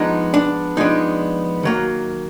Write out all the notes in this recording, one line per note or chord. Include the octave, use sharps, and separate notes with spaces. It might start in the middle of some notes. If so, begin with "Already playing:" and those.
Already playing: F3 G#3 B3 D4 D#4
D4
F3 G#3 B3 D4 D#4
D#3 F#3 A#3